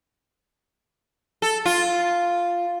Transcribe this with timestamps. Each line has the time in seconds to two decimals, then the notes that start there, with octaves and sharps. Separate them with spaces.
1.42 A4
1.66 F4